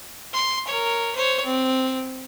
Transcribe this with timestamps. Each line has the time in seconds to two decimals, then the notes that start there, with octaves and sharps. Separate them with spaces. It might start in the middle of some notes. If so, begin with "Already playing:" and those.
0.33 C6
0.67 A#4 C#5
1.15 C5 C#5
1.45 C4